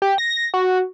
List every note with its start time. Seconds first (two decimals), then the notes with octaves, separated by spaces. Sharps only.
0.02 G4
0.18 A#6
0.54 F#4